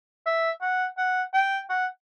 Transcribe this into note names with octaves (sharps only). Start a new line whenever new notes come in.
E5
F#5
F#5
G5
F#5